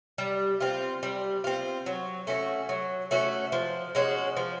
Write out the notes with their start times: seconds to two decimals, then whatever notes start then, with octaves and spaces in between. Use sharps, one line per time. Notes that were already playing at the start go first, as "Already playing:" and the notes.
0.18 G3
0.60 C4 F4
1.03 G3
1.44 C4 F4
1.86 F#3
2.27 A3 C#4 F#4
2.69 F#3
3.11 A3 C#4 F#4
3.52 F3
3.95 G#3 C#4 F#4
4.37 F3